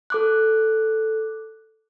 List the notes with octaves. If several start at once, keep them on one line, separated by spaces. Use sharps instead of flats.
A4 D6 F#6